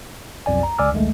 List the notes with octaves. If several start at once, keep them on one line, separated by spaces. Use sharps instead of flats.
B1 F2 D5 G#5
A#5
C#2 D5 G#5 D6 E6 F6
A#1 D#2 G#3 A3